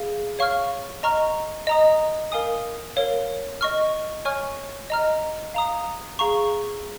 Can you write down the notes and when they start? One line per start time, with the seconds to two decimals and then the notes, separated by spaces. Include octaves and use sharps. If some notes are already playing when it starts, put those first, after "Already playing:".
Already playing: G#4 F5
0.39 C#5 F5 C#6 F6
1.03 D#5 A#5 C#6 F6
1.67 D#5 A#5 D#6
2.32 A#4 F5 G#5 D#6
2.96 A#4 C#5 F5
3.61 D#5 C#6 F6
4.25 C#5 G#5 C#6 F6
4.90 D#5 A#5 F6
5.54 F5 A#5 D#6
6.19 G#4 F5 A#5 C#6